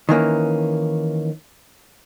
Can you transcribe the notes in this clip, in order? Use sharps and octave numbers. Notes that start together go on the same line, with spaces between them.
D#3 E3 A#3 C#4